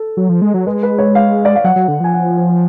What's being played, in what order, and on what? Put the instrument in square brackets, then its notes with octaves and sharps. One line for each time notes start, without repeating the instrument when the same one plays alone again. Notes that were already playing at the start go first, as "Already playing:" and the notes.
Already playing: [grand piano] A4
[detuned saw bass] F#3
F3
G#3
F#3
[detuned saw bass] G#3 [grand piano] B4
[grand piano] B4
C#5
F5
D5
F5
[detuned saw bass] F#3 [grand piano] F#5
[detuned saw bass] F#3
D3
[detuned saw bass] F3 [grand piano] G#5
[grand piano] F#5
G#5